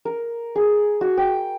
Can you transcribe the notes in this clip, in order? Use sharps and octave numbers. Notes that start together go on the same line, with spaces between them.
A#4
G#4
F#4
G5